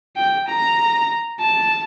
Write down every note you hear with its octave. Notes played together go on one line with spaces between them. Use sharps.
G5
A#5
A5